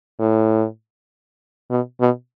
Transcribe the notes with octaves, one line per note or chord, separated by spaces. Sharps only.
A2
B2
B2